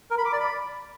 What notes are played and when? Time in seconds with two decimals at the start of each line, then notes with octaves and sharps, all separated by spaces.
0.11 A#4
0.18 B5
0.25 D6
0.33 D5
0.40 B5